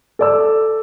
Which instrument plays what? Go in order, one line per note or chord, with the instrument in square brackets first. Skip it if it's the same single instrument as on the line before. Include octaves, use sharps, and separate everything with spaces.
[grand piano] A4 D5 E6